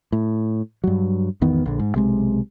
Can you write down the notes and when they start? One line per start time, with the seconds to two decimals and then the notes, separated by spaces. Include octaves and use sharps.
0.12 A2
0.84 G2 F#3
1.41 G#1 E2 D#3 B3
1.66 A#1 D3
1.79 G#2
1.94 B1 C3 G#3